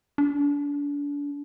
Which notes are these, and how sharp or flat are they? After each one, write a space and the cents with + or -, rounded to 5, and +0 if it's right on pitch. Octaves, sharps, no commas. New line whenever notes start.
D4 -35